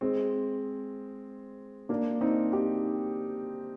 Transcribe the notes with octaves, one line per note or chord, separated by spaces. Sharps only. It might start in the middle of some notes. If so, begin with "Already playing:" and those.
G#3 C4
A#3 D4
C4 D#4
D#4 G4